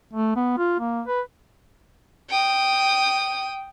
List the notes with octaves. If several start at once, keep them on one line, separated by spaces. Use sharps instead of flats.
A3
B3
F4
A#3
B4
G5 D#6